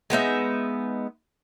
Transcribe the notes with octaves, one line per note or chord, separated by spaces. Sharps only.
G#3 B3 D#4 E5